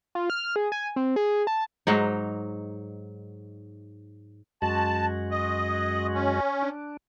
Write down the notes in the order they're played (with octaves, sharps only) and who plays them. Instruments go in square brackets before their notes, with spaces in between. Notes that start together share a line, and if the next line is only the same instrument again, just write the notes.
[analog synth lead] F4
F6
G#4
G#5
C4
G#4
A5
[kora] G#2 F#3 D#4
[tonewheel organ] F#2 G#3 F#4 [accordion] A5
[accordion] D#5
C#4
[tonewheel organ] D4